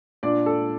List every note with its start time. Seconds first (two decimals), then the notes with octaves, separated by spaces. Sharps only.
0.23 A#2 D4 D5
0.46 A4